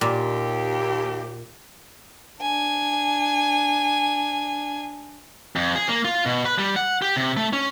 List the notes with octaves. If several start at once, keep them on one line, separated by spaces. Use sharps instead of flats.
D#2 A#2 G4
D4 G#5
F2
G#4
A#3
F4
B2
B4
G3
F#5
G4
C3
A3
C#4